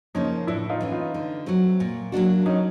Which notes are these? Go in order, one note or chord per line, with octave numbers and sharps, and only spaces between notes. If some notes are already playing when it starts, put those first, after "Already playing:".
C#3 F3 A#3 C#4 D#4
A2 D4 E4
D#4 F4
E3 A3 C#4
D#4 F4
D3
F#3 A3 C4
A#2
F#3 A#3 D4 F#4
F#3 C#4 D#4